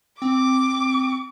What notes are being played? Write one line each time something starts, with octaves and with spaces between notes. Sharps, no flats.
C4 D6